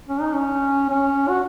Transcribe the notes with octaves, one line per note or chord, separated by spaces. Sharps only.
C#4
D#4
C#4
C#4
F#4